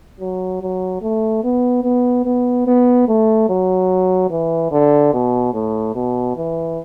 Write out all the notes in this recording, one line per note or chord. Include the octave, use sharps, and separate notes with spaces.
F#3
F#3
A3
B3
B3
B3
B3
A3
F#3
E3
D3
B2
A2
B2
E3